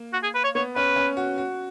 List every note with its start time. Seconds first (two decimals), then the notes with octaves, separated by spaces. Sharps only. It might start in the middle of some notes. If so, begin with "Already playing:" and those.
Already playing: A#3
0.13 F#4
0.23 G#4
0.35 B4
0.44 C#5
0.55 B3 C#5
0.76 C#4 B4
0.96 C#4
1.17 F#4
1.38 F#4